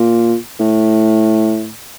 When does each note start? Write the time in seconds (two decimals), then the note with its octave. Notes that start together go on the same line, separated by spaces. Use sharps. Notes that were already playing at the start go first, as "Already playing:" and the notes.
Already playing: A#2
0.59 A2